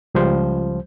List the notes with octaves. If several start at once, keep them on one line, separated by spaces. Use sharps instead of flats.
C#2 F3 G3 C5